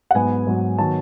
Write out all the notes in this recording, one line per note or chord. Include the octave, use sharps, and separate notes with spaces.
F#5
G#2 F#3 B3 G#5
G#2 F#3 B3
D#3 F#3 B3 A5